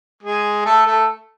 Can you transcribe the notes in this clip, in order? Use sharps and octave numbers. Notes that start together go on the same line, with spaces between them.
G#3 G#4
A3 A4
A3 A4